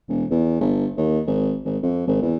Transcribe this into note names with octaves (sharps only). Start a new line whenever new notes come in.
E1
E2
G1
D#2
G#1
G#1
F2
G#1
E2